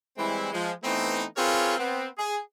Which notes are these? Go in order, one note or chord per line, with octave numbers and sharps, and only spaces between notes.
E3 G3 G#3 C4 E4
F3 G#3
E3 A3 B3 C4 D#4
C4 F4 G#4 A#4 B4 C#5
B3 C4
G#4